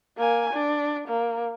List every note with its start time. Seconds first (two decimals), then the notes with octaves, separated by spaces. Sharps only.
0.18 A#3 G#5
0.53 D4
1.08 A#3